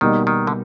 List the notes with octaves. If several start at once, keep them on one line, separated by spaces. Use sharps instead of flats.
B2 D#3 G3 A#3 D#4
D#3
D3